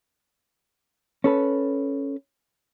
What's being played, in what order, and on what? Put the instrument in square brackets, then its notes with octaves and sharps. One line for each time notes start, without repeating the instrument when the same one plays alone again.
[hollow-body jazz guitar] C#4 A4 B4